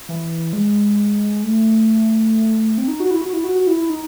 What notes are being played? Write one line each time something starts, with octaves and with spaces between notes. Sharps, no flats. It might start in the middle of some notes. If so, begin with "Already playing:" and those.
E3
G#3
A3
C4
D#4
F#4
E4
F#4
E4
F#4
F#4
E4
E4
D#4